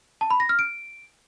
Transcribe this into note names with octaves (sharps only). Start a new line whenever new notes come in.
A5
B5
A#6
F6
D7